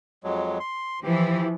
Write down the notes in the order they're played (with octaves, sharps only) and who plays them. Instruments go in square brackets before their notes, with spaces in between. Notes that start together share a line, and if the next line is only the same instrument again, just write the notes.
[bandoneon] F2 F#3 G#3
C6
[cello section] E3 F3 [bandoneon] G4